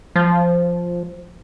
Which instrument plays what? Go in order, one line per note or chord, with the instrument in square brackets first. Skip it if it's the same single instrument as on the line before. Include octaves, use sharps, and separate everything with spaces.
[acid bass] F3